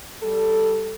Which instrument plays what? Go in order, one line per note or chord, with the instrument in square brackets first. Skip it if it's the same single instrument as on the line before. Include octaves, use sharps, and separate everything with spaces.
[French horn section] G3 A4